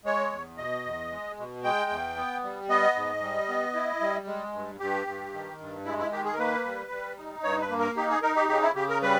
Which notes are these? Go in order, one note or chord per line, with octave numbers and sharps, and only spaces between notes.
G#3 C#5
E2
B2 D#5
E2
G#3
B2
G#3 G5
E2
B3
G3
B3 D#5
G#2
G3
B3
E4
G3
G#3
G2
G2 G4
G2
D#3
G2
G#3 E4
E4
D#3 G4
G#4
A#4
A#3 B4
G3
G3
D#4
G2 C#5
B4
A#3
A#4
D#4 G4
G#4
D#4 A#4
G4
C#3 G4
E4
C#3 G4
A#4
G3 B4